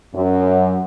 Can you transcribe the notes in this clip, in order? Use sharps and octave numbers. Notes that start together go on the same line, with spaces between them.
F#2